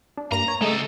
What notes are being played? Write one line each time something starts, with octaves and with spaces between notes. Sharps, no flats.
D4
G2 A#3 A#5 A#6
C#5
C#2 G#3 A3 A4 D#5